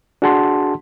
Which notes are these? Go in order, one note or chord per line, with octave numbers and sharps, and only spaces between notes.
D4 F#4 G#4 F#5 A5 C6